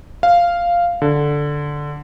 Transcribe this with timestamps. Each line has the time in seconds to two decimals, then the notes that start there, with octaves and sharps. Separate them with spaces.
0.23 F5
1.02 D3